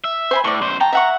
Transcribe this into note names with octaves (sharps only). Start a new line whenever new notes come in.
E5
C5 G#5 B5
A2 D5 C#6
F#2 C5
G5 A5 A#5
E5 F#5 C#6